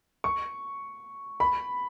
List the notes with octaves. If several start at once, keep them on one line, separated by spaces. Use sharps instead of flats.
C#6
B5